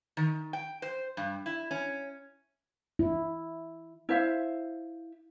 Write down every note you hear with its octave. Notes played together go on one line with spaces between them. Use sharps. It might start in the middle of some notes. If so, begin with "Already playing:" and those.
D#3
G5
C5
G2
E4
C#4
E4
E4 C5 E5 F5